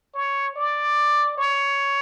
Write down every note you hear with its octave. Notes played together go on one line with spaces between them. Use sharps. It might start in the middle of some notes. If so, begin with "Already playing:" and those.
C#5
D5
C#5